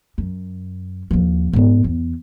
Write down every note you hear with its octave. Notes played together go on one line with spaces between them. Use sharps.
F#2
D#2 F3
G#2 B3
E2